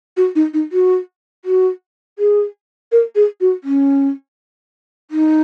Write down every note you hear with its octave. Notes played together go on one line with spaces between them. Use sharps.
F#4
D#4
D#4
F#4
F#4
G#4
A#4
G#4
F#4
C#4
D#4